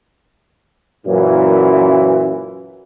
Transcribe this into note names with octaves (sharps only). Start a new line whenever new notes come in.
F#2 A#2 E3